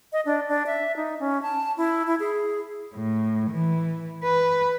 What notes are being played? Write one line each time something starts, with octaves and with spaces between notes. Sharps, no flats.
D#5
D4
D4
E5
D#4
C#4
A5
E4
E4
G#4
A2
E3
B4